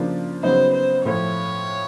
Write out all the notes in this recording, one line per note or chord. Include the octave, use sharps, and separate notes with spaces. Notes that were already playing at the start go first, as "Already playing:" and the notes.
Already playing: C#3 F3 A#3 D4 F4
C#3 F#3 B3 D#4 C5
C5
A2 F3 A3 C#5